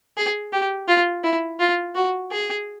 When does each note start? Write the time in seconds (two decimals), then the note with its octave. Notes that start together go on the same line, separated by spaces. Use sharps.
0.17 G#4
0.53 G4
0.88 F4
1.24 E4
1.60 F4
1.95 F#4
2.31 G#4